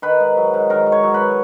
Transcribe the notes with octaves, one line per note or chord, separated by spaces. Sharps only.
D#3 B4
G#2
F#3
G#2
D#3 A#4
G#2
C#5
F#3
B4